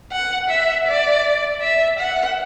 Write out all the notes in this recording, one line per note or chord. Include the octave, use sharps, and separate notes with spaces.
F#5
E5
D5
E5
F#5